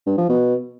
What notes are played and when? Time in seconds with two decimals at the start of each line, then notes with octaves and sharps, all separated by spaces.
0.06 G2
0.18 F3
0.29 B2